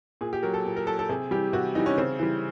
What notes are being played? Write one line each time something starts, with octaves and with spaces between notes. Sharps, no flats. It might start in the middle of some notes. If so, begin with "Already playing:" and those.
A#2 G#4
G4
F#3 A#4
A4
A#2
A#4
F#3 A4
A4
C3 G#4
E3 G3 G4
C3 F#4
E3 G3 D#4
C#4
C#3 C4
E3 G3